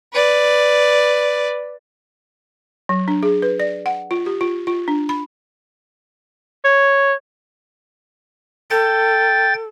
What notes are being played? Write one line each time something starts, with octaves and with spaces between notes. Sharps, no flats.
B4 D5
F#3
D4
G#4
B4
D5
F#5
F4
G4
F4
F4
D4
B5
C#5
A4 G5 A6